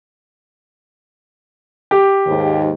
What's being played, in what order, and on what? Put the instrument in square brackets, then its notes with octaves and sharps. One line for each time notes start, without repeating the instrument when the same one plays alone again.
[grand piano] G4
[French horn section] D#2 G#2